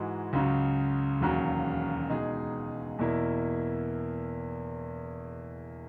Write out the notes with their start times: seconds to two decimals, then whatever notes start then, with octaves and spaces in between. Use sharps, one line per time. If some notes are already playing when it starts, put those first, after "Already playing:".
Already playing: G#2 E3 G#3 D#4 F#4
0.33 C#2 C#3 F#3
1.20 E1 D#2 C#3 F#3
2.09 B2 G#3 D#4 G#4
2.99 E2 B2 A#3 E4